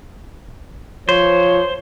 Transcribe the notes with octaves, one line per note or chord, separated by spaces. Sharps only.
F3 C5 C#5